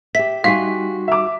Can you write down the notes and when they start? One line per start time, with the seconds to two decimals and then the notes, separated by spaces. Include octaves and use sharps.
0.15 G4 E5 B6
0.44 G3 D#4 F#4 G4 F5 G#5 C6 B6
1.08 E5 D6